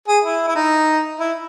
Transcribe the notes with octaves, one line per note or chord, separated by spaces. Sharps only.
G#4
E4
E4
D#4
E4